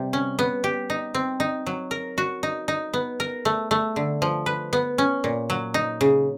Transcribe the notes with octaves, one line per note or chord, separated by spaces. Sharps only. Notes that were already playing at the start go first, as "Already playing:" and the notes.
Already playing: C3 G3
C#4
B3
G4
D#4
C4
D#4
F#3
A#4
F#4
D#4
D#4
B3
A#4
A3
A3
D3
F3
B4
B3
C#4
A#2
F#3
D#4
C#3